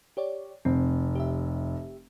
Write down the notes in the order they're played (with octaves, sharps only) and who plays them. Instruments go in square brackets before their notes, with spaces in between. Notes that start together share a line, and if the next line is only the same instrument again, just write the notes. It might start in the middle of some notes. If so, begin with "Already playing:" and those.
[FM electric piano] G4 C#5 D5
[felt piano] F1 [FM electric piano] C4
[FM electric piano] G4 E5